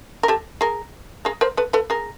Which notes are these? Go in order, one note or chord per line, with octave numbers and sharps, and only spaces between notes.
A#4
G4 A4
G#4 A#4
G#4 A#4
A#4 C5
A4 B4
A4 B4
G#4 A#4